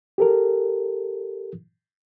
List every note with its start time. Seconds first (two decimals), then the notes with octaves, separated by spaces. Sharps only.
0.18 G4 A4 A#4